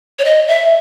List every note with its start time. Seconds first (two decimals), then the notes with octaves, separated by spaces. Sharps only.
0.19 C#5
0.25 D#5
0.48 E5